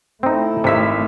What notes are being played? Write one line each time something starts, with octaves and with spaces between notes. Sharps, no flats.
A3 C4 D#4 E4
G#1 C3 E5 B6